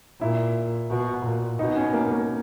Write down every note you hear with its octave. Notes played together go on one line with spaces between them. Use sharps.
A#2 E4
B2
A#2
B2 D#4
C#4
A#3
A#3